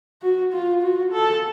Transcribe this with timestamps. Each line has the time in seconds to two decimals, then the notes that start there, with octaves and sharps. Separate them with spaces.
0.22 F#4
0.53 F4
0.82 F#4
1.13 A4